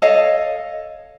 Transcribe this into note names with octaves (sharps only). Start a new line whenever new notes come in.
A4 C#5 D#5 F5